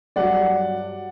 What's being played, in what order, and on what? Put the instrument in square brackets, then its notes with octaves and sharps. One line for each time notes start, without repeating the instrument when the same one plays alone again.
[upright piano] G2 F#3 D5 F#5